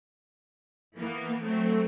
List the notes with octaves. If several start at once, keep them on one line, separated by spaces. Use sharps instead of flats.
E3 A#3 B3
F#3 A3 C4